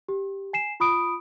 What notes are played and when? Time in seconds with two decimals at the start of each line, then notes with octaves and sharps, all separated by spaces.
0.09 G4
0.53 G#5 C7 E7
0.80 F4 B5 D#6 D7